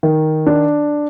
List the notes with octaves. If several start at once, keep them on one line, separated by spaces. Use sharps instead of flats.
D#3
D4